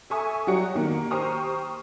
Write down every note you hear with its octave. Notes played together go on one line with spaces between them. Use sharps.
A4 E5 G#5 C#6 D#6
F#3 G3 F#4 G4 C#7
D#3 A#3
G4 C5 A#5 C#6 D#6 F6